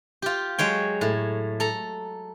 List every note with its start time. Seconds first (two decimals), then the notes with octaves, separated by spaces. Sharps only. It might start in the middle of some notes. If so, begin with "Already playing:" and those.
0.22 F4 G4
0.58 F#3 G#3 C#5 G5
1.01 A2
1.60 A4 A#5